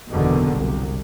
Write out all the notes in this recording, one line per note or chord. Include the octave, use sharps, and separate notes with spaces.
F#1 E2 B2 D3 D#3
C2